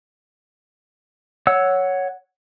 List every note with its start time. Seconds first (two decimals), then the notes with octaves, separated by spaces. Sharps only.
1.47 C#5 F#5 E6